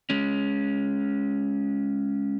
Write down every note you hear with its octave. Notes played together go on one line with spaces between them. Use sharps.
G#3 C#4